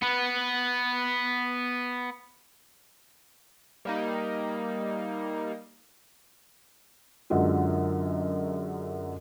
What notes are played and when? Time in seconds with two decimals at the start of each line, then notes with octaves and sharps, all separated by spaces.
0.02 B3 B4
3.85 G3 A#3 D#4
7.30 F#2 D3 F#3 G#3 F4